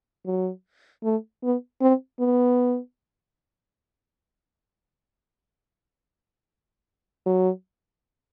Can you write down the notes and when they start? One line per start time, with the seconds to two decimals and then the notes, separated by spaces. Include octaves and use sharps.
0.26 F#3
1.04 A3
1.43 B3
1.81 C4
2.20 B3
7.26 F#3